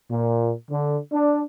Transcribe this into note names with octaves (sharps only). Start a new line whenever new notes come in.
A#2
D3
D4